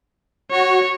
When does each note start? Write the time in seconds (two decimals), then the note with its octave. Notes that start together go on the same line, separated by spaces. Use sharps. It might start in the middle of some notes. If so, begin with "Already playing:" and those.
0.52 F#4 C#5